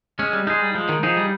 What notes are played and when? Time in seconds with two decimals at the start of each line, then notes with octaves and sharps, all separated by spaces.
0.19 G#3 C#4
0.33 G3
0.47 G#3 D#4 G#4
0.61 G3
0.75 F3 G#3
0.89 D#3
1.03 F3 D#4 G#4
1.17 G3